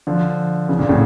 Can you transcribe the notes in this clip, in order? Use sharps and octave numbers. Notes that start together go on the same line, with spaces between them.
D3 F3
C#3 E3
A#2 D3
A2 C#3